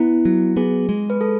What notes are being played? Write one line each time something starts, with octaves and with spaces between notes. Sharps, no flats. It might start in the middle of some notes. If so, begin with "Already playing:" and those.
Already playing: B3 E4
F#3
B3 G#4
G#3
B4
A4